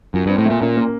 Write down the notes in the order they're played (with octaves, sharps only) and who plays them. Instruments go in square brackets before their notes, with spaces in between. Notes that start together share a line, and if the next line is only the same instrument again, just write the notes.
[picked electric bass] F#2 [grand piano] F4
[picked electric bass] G2
[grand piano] C4
[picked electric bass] A2
[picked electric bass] A#2 [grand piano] A3
[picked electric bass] A#2 [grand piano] C#4
[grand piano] A#3